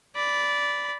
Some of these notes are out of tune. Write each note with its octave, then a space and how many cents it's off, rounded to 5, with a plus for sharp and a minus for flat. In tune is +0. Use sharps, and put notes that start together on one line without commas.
D5 -15 B5 +0